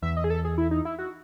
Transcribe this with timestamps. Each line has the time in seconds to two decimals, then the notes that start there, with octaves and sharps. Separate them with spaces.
0.02 E2 E5
0.17 D#5
0.24 G#4
0.30 A4
0.45 G#4
0.58 E4
0.71 D#4
0.85 E4
0.99 F#4